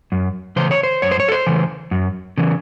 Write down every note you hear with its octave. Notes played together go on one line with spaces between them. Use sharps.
F#2
C#3 E3 C5
C#5
C5
F#2 C#5
C5
C#5
A4
C5
C#3 E3
F#2
C#3 E3